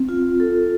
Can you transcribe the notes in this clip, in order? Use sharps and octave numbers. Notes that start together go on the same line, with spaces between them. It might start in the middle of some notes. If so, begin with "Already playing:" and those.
Already playing: C4
F4
A4